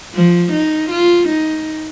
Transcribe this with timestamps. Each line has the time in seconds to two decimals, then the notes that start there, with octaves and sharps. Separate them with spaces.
0.15 F3
0.52 D#4
0.90 F4
1.28 D#4